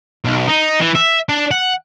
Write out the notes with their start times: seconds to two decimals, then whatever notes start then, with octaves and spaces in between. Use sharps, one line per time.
0.25 B1
0.48 D#4
0.81 E3
0.95 E5
1.29 D4
1.51 F#5